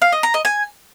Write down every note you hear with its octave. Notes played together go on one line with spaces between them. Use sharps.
F5
D#5
A#5
D#5
G#5